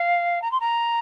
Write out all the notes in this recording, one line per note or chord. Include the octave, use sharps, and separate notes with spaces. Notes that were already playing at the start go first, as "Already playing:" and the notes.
Already playing: F5
A#5
C6
A#5